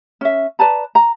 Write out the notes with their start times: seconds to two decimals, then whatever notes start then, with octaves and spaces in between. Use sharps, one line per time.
0.21 C#4 E5
0.59 B4 D5 A5 A#5
0.95 A#5